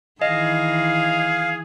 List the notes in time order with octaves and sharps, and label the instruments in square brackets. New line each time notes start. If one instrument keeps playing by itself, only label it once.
[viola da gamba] D#3 E3 [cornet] G#4 [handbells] D#5 [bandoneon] F5